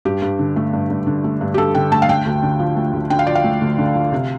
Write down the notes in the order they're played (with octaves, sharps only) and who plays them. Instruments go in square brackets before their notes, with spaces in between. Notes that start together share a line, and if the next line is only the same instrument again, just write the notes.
[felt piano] G2 G4
G2
D3
A3
G2
G2
D3
A3
G2
G4
G2 A4
D3 G5
A3 A5
F5
A3 G5
D2
D3
F3
A3
D2
D3 G5
F5
F3 D5
F5
A3
D2
D3
F3
C3